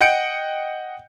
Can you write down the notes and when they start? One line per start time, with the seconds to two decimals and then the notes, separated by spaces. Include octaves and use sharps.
0.01 D#5 F#5 G5 G6 C#7 D7